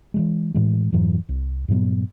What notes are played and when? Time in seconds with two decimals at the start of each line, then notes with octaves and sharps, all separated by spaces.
0.14 E3 F#3 G#3
0.54 A2 E3 G#3
0.92 F2 G#2 E3 F#3
1.29 C2
1.68 G2 A#2 F#3 B3